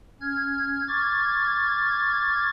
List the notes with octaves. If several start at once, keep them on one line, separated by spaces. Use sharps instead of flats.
C#4 F6 G#6
C#6 D6 F6 G#6 A6